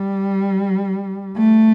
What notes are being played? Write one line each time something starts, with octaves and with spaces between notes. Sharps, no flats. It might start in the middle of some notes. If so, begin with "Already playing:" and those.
Already playing: G3
A3